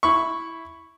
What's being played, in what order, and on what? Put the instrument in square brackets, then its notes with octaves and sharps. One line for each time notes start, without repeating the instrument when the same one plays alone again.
[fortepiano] E4 B5 C#6